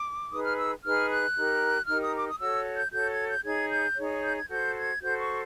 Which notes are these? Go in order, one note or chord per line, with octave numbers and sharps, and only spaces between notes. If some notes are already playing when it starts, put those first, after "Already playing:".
Already playing: D6
D#4 G#4 B4 D#6
F6
E6
D#4 G#4 B4 F6
F#6
D#4 G4 A#4
D#4 G4 A#4 F6
D#6
D6
D#6
F#4 A4 C#5 E6
G6
F#4 A4 C#5 G6
G#6
G6
D#4 G#4 C#5 G#6
G6
D#4 G#4 C#5
G6
G#6
F#4 A4 C5 G6
G#6
F#4 A4 C5 G6
C#6